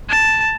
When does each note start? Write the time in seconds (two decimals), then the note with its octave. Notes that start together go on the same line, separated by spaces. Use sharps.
0.09 A5